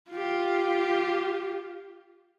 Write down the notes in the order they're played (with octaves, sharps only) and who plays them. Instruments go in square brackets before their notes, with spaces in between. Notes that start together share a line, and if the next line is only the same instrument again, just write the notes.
[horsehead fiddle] F4 G4